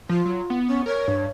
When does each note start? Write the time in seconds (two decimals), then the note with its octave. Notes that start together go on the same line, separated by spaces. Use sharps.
0.09 F3 F4
0.25 F#3
0.50 B3
0.67 C#4
0.86 A#4 C#5
1.08 G2